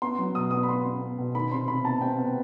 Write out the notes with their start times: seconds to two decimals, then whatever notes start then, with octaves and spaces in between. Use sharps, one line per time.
0.02 B3 C6
0.19 F#3
0.35 B2 D#6
0.51 B3 D#6
0.63 B5
0.69 B3 C6
0.85 B3
1.02 B3
1.19 B2
1.35 D#3 B5
1.51 C3 C6
1.68 C3 B5
1.84 B3 A5
2.01 C3 G5
2.19 B3